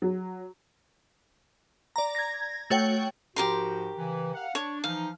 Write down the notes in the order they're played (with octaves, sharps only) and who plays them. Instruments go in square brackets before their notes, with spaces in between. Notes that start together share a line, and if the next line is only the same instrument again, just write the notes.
[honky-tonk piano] F#3
[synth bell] D5 A#5
G#6 A#6
A3 F#4 C#5 G5
[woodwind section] G#2 F3 F#4 [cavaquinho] G4 A#4 C6
[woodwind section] C#3 E3
F5 F#5
[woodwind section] D4 [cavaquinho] C#5
[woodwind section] E3 F3 D#4 [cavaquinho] F5